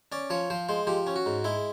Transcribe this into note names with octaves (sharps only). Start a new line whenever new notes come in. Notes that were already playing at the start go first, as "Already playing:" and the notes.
C#4 D5
F3 C#5
F3 C5
G#3 C5
F3 G4
C#4
F#4
G#2
G#3 E4